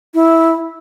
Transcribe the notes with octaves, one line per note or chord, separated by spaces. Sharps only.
E4